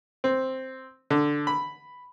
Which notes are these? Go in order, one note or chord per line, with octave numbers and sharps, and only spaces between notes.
C4
D3
B5